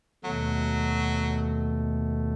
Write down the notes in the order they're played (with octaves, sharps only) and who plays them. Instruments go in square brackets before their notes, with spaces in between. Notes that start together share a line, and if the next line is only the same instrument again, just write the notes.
[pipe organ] D#2 B2 A3 [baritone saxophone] F#3